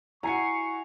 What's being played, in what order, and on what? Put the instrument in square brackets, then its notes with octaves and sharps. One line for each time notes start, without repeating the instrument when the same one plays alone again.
[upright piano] E4 F#4 [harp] G#5 C7 C#7 [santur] A#5 [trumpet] C#6